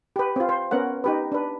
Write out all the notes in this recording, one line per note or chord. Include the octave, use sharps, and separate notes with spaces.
G4 B4
C4 F4
C5
B3 C#4 A#4 F#5
D#4 G4 B4
D4 B4